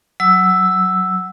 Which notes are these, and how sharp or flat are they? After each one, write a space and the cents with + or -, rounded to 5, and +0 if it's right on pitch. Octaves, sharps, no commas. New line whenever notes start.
F#3 +0 E6 +0